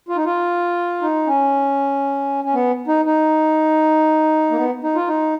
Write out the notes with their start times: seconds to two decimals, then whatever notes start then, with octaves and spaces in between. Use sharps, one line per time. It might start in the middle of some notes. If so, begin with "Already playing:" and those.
0.09 F4
0.16 D#4
0.25 F4
1.02 D#4
1.27 C#4
2.44 C#4
2.54 B3
2.87 D#4
3.05 D#4
4.51 A#3
4.57 B3
4.83 D#4
4.95 F4
5.08 D#4